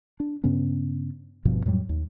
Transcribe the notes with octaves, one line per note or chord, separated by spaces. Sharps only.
D4
G2 C#3 B3 C#4
G#1 G2 B2 F3
F2 A2 F#3 G3
D#2